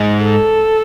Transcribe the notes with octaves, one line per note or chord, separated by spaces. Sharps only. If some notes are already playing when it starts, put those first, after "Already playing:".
Already playing: G#2
A4